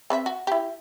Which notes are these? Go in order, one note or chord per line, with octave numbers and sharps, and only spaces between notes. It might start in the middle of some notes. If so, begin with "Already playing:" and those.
C4 B4 E5
F#4
E4 G4